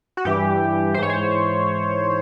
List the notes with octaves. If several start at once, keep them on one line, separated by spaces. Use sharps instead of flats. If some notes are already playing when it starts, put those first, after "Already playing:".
F#4
G2 E3 G4
G#2 E3 C5 C#5
C5